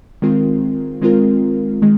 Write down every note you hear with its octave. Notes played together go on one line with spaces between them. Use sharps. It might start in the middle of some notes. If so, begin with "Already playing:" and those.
D#3 G#3 C4 F4 A#4
D#3 G#3 C4 F4 A#4
D#3 G#3